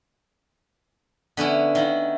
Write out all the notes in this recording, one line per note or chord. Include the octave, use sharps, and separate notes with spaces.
D3 B3 C#4 E4
D#3 E4 F4